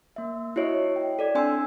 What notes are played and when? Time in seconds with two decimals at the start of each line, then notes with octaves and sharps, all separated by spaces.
0.16 A#3 E5
0.56 E4 F#4 C#5 D#5 E5
0.96 G5
1.19 A4 D5 G#6
1.35 C4 D4 G#5 C6 E6